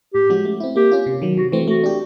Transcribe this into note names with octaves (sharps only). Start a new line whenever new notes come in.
A2 G4
F3 G#3 C#4 F#4
A3
C4 E4
A#3 G4
C#4 F4
C3
D#3 F#3
C3 F#4
E3 A3 C4
A3 F#4
D4 G4